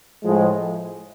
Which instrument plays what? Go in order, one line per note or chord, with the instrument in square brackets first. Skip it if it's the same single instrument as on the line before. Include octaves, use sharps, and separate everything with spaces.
[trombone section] A2 F3 G#3